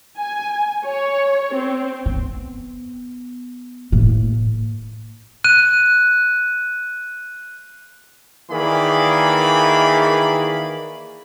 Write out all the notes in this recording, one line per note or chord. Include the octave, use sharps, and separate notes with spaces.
G#5
C#5
C4
B3
A2 A#3
F#6 D#7
D#3 E3 A#3 G#4 D5 B5